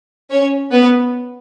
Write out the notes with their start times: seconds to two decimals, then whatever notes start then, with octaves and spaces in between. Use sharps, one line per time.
0.31 C#4 C#5
0.72 B3 B4